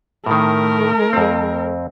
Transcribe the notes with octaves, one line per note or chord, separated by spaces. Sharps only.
A2 D#3 A3 A#4
F2 C4